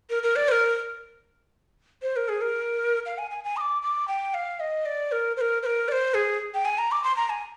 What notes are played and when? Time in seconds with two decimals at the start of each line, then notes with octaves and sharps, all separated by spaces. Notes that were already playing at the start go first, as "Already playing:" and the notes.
0.10 A#4
0.23 A#4
0.36 D5
0.48 C5
0.52 A#4
2.02 C5
2.16 A#4
2.29 G#4
2.41 A#4
3.06 F5
3.18 G#5
3.31 G#5
3.44 G#5
3.57 D#6
3.61 D6
3.82 D6
4.08 G5
4.34 F5
4.60 D#5
4.86 D5
5.12 A#4
5.37 C5
5.41 A#4
5.63 C5
5.66 A#4
5.88 D5
5.92 C5
6.14 G#4
6.54 G5
6.65 G#5
6.78 A#5
6.92 D6
7.04 C6
7.17 A#5
7.30 G#5